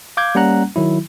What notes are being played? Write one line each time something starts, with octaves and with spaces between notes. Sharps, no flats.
F5 D6 G6 G#6
G3 A#3 C#4 F#5 A#5 F#6
D#3 F#3 E4